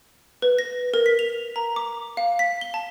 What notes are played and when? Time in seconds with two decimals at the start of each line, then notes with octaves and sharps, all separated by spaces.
0.42 B4
0.59 A#6
0.94 A#4
1.06 B6
1.19 F7
1.56 A#5
1.76 D6
2.17 F5
2.39 B6
2.61 G7
2.74 A5